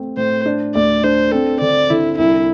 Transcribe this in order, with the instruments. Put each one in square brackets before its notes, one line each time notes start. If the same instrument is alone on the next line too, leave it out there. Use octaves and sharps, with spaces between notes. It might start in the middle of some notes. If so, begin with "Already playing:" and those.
Already playing: [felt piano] A3 C4
[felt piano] A2 [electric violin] C5
[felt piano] D4
[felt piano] D2 [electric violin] D5
[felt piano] D4 [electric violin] C5
[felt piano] C4 [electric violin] A4
[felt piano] D3 [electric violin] D5
[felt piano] D3 [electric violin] E4
[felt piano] C2 [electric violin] E4